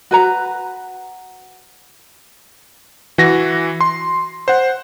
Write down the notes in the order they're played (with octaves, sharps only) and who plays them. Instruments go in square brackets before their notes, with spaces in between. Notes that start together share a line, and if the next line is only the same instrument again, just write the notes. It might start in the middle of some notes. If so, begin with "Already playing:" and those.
[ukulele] F#4 B4 A#5
[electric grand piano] E3 F#4 A#6
C6
C5 F#5